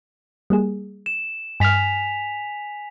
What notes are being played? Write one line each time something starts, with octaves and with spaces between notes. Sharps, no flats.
G3 A#3 G#4
E7
G2 G#5 F6 B6 F7